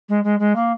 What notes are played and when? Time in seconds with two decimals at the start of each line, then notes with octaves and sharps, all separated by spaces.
0.09 G#3
0.24 G#3
0.39 G#3
0.55 A#3